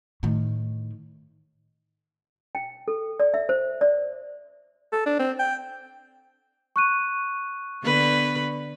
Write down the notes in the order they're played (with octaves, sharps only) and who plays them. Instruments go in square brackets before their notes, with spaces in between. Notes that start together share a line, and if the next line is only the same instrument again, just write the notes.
[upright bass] A2 D#3
[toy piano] G5
A4
D5
E5
C5
D5
[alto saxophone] A4
D4
C4
G5
[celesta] C#6 F#6 D#7
[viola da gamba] D3 B3 B4